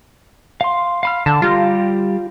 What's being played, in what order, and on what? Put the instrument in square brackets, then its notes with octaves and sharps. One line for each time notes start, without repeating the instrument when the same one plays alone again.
[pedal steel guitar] F5 C6
F5 B5 F6
[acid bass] D3 [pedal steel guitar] A5
[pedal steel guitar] G3 G4 A#5 [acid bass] F4